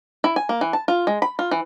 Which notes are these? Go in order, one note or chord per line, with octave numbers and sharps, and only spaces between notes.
E4
G#5
A#3
E3
A5
F4
G#3
B5
F4
E3